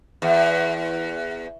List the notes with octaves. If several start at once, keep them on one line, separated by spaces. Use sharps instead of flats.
E2